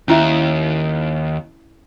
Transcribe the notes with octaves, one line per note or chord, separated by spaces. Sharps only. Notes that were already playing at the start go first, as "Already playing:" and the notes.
D#2 C#4 E4 E5